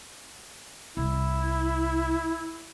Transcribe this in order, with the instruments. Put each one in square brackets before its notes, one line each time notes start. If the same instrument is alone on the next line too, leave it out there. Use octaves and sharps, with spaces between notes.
[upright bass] C2 [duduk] E4